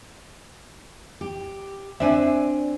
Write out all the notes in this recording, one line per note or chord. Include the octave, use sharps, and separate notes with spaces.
G4
C4 D4 D5 E5 G#5